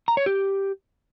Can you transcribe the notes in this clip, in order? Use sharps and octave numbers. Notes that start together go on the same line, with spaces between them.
A#5
C#5
G4